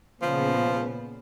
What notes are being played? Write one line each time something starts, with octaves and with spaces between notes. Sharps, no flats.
A#2 C#3 F3 B3